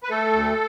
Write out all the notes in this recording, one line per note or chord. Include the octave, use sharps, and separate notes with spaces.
B4
A3 A4
D2